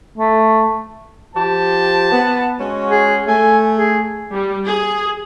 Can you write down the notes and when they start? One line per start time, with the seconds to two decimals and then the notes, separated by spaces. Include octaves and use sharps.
0.18 A3
1.35 F3 G4 C5 A5
2.11 B3
2.59 G#3 C#4 F#4
2.90 G#4
3.27 A3 G#5
3.77 G#4
4.32 G3
4.66 G#4